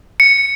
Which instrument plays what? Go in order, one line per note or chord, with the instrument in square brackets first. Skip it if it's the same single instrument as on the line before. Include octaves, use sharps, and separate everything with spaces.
[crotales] C#7